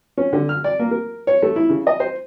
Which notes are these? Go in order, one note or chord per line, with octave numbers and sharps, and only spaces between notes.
C#4
D3
F6
D5
A#3
A#4
C#5
A3
E4
C#3
D#5
C5